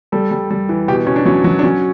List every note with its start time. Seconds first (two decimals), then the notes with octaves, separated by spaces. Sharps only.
0.12 G3 A4
0.31 G3
0.50 G3
0.69 E3
0.88 B2 G4
1.07 B2 C#4
1.16 D4
1.25 F#3 C#4
1.44 F#3
1.59 D4
1.63 F#3 C#4